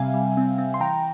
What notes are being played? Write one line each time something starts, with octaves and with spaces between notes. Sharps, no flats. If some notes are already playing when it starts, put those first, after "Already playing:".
Already playing: C3 G3 C4 E5 F5 G5 G#5
G3
C4
C4
C6
E3 G5 A#5